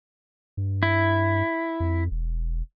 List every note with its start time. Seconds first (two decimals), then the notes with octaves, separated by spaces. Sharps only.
0.57 G2
0.83 E4
1.80 F2
2.11 E1